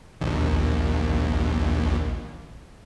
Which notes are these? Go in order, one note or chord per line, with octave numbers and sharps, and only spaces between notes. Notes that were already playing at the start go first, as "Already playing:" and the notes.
A#1 D#2